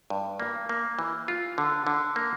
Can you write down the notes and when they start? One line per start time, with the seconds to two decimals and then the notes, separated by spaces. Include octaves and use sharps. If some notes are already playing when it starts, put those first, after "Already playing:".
0.10 G2
0.40 A#3
0.69 A#3
0.99 E3
1.28 F4
1.58 D3
1.87 D3
2.16 A#3